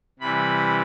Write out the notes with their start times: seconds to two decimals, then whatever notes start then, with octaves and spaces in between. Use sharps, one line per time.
0.19 C3 E3 G3 B5